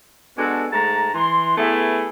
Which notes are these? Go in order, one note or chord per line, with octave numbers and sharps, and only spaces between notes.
G#3 B3 D4 F#4 A4
G#2 A3 A5 A#5
E3 C6
A3 B3 E4 G#4 B4 E5